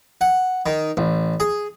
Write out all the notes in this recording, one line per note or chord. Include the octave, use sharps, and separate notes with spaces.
F#5
D#3
A1
G#4